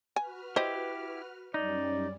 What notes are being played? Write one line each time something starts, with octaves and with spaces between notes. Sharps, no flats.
F#4 B4 G#5 F6
E4 G4 C5 D#5
F#2 G3 C#4 D#4 D5